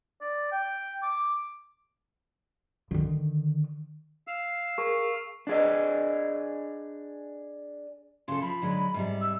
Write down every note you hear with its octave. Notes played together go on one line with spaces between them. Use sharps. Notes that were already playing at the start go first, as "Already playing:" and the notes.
D5
G5
D6
D3 D#3
F5 E6
G#4 A#4 C#6
D4 G#4 D#5
C#3 A4 C6
F3 B5
D3 F#3 G#3
G#2 C3 G3
E6